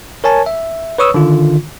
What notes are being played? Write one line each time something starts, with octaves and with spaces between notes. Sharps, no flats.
A#4 C#5 G#5 A5
E5
B4 C#5 C#6 D#6 E6
D3 D#3 F4